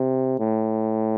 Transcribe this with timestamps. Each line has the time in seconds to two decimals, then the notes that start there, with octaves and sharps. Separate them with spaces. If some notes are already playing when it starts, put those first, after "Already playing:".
Already playing: C3
0.39 A2